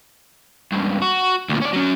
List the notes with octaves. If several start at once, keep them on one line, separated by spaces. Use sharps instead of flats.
C#2 G2
F#4
D2 A#2
C#4 D5
F#3 C#4